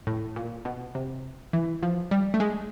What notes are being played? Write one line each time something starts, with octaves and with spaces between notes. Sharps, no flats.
A2
A#2
B2
C3
E3
F3
G3
A3
G#3